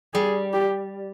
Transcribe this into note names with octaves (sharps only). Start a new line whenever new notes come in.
G3 G#4
G4